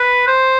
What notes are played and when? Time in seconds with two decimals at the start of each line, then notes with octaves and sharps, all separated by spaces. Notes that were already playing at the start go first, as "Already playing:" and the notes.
Already playing: B4
0.27 C5